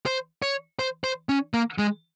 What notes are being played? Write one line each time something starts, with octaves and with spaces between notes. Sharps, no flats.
C5
C#5
C5
C5
C#4
A#3
G#3